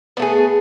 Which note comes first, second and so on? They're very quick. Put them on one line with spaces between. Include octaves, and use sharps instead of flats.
B3 A3 G#4